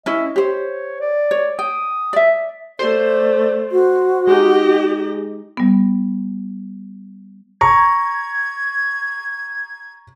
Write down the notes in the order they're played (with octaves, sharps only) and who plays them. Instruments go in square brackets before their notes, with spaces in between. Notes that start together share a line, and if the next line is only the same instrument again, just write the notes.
[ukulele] C#4 E4 [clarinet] D#5
[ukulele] G4 C5 [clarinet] C#5
[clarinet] D5
[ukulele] C#5
[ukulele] G5 [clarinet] D#6
[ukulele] D5 E5
[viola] A3 [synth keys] C5 [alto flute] D5
[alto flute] F#4
[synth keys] G#3 D#4 [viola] G4 D#5
[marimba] G3 B3
[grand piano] A#5 C#6 [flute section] G#6